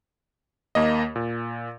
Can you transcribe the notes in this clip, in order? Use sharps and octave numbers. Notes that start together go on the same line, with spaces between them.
D#2 A#3 D#5
A#2